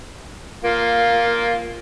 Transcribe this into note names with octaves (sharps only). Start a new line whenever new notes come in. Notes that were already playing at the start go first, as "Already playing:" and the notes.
A#3 F4